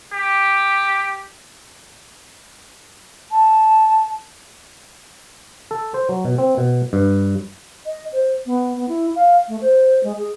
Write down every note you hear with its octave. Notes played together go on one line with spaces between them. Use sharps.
G4
A5
A4
C5
F#3
B2
C4
B2
G2
D#5
C5
B3
B3
E4
F5
A3
C5
G#3
G#4